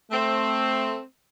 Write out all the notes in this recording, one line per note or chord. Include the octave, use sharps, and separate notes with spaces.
A3 C4